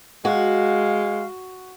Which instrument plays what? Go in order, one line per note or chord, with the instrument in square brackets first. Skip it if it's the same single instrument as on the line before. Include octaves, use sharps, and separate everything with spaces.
[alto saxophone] G#3 [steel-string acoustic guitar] F#4 [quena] F5